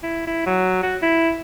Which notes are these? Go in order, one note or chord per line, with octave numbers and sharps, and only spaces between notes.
E4
E4
F#3
F#4
E4